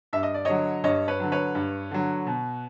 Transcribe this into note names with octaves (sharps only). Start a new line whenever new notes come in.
G2 E5
D#5
D5
D3 F#3 C#5 D#5
G2 C#5 D#5
B4 C#5
D3 F#3
B4 C#5
G2
D3 F#3
B2